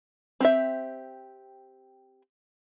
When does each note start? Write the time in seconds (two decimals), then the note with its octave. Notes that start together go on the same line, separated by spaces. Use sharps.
0.40 C4 G4 E5